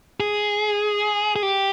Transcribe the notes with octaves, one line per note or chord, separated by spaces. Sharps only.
G#4
G#4
G4